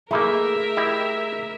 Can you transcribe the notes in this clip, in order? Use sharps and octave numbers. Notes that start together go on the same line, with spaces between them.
A3 A#3 D#4 E4 G#4 A#4 E5
E4 G4 D#5